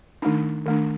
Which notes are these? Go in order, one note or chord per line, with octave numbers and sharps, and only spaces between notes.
D#3 A3 D4 D#4
D#3 A3 D4